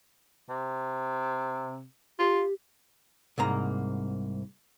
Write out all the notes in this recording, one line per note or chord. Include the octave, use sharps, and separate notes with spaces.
C3
F4 G4
C2 G#2 A#3 A#5